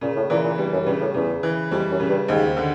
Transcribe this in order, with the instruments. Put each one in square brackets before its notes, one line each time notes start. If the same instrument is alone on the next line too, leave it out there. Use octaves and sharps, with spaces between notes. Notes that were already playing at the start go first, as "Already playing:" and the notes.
[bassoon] A#2 [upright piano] C#3
[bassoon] A2
[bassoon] A#2 [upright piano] E3
[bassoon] A#2
[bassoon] G2 [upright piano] G3
[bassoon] F#2
[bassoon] G2 [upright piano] C#3
[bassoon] A2
[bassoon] E2 [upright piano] C#3
[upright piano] E3
[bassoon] F2 [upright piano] G3
[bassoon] F#2
[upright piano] C#3
[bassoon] G2
[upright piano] D#2 [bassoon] G#2
[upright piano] D3